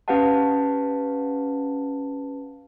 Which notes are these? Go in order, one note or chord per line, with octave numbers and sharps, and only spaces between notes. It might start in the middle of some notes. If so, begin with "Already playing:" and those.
C#4 G4 B4 F5 F#5 A5